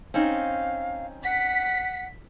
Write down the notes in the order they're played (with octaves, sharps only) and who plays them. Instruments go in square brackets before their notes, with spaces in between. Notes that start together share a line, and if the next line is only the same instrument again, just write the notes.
[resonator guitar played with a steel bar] C4 C#4 D#4 [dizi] F5
[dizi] F#5 [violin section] B6